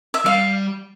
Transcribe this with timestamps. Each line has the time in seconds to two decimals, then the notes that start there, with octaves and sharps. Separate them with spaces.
0.14 E5
0.25 G3 F5